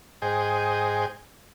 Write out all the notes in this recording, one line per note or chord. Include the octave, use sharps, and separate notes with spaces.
G#2 G#4 C5 D#5 G5 G#5